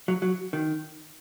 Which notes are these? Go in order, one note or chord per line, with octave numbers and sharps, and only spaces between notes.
F#3
F#3
D#3